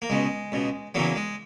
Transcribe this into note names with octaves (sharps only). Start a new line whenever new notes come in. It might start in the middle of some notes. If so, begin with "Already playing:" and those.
A#3
C#2 B2 G#3
C#2 B2
E2 C#3 E3 F#3 A#3
G#3